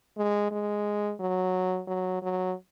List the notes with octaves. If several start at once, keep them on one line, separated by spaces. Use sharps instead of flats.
G#3
G#3
F#3
F#3
F#3